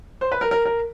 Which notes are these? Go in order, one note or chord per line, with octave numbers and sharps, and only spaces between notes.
C5
B4
A#4
A#4
A#4